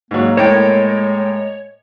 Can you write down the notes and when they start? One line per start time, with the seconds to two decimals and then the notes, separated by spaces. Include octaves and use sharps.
0.11 G#2 F#3 A#3
0.37 A2 G#3 A#3 C#5 G5